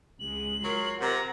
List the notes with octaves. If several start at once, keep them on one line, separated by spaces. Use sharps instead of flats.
C#2 G#3 F#7
F#3 F4 A#4 C6
C3 F#5 A#5